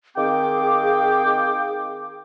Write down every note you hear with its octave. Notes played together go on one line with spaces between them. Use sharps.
D#3 C4 G#4 F5 G5 D6